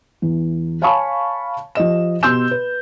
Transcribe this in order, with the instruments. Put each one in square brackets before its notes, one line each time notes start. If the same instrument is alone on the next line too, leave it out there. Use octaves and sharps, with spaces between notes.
[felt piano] E2
C#5 F5 G#5 A5 B5 C#6
F3 G4 D#5 E7
B2 G4 C6 E6 G6 E7
B4